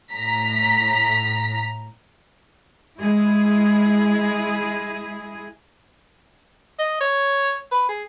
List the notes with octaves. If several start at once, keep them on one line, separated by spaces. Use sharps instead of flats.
A2 A#5 B6
G#3 E4 G#4
D#5
C#5
B4
G#4